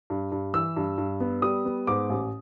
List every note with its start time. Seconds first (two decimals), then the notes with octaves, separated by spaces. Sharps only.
0.10 G2
0.32 G2
0.54 E3 E6
0.77 G2
0.98 G2
1.20 B3
1.42 G3 D#6
1.65 B3
1.87 G#2 D6
2.10 A1